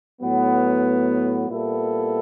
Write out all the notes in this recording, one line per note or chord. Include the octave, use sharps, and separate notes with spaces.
A2 F#3 B3
A#2 G3 B3 E4 A4